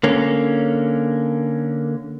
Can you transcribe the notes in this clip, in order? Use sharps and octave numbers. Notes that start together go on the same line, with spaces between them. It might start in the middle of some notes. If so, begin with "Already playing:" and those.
D3 A#3 C#4